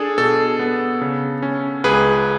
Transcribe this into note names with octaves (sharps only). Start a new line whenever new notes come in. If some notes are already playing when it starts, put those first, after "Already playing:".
Already playing: D4 G#4 A4
B2 A4
B3
C#3
C#4
C#2 G#4 B4